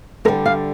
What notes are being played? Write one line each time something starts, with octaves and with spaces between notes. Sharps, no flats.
D3 G3 A#4
F5